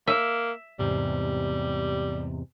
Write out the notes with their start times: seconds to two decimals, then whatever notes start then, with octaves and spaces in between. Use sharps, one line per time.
0.07 A#3 E5
0.79 E2 G#2 C3 G3